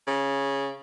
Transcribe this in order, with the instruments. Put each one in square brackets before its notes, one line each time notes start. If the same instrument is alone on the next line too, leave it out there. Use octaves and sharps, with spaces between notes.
[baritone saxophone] C#3